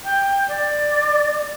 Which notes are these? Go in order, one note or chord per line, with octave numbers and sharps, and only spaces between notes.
G5
D5